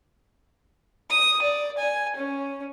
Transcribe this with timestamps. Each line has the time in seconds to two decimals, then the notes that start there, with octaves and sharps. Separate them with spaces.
1.10 D#6
1.42 D5
1.78 G#5
2.16 C#4